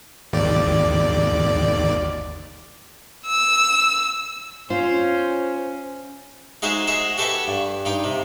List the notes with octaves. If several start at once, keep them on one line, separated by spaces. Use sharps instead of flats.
G#1 D#2 D5
E6
C#4 F4 C5
G#3 D#4 F#4 G#4 C5 E5
F#4 G#4 C5 D#5 E5
F#4 G4 A4 B4 E5 G#5
G2
G2 D#4 G5
C3